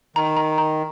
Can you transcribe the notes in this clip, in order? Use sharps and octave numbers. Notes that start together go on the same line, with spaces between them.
D#3 A#5
A#5
A#5